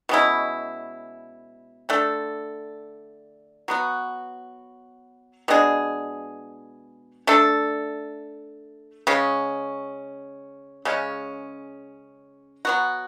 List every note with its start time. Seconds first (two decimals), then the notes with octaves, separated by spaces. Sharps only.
0.09 B2 G#3 C#4 E4
1.89 D3 A3 D4 A4
3.68 F#3 B3 F#4
5.48 B2 G#3 D4 G#4
7.27 A3 D4 A4
9.07 C#3 G#3 C#4
10.85 C#3 G#3 C#4
12.65 F#3 B3 F#4